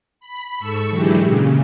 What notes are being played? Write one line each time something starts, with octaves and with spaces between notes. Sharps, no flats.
B5
G#2 A4 C#6 E6
D3 E3 F#3 G#3 E4 G4
A#2 C#3